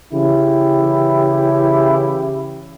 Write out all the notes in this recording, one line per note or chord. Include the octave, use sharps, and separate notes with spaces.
C#3 E3 E4 G4